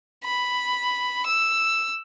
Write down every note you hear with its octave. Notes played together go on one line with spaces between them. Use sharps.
B5
E6